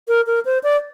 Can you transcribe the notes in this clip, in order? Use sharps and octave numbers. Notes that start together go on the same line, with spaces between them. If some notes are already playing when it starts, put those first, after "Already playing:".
A#4
A#4
C5
D5